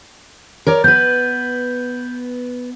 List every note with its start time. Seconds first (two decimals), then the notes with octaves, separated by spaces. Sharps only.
0.67 A#4 C#5 D5
0.84 B3 B4 G6